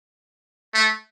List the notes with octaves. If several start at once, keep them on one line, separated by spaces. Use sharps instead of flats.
A3